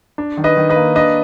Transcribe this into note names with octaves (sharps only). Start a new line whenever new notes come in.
D4
D#3
B4 D#5
D#3
B4 D#5
A#3
D4 B4 D#5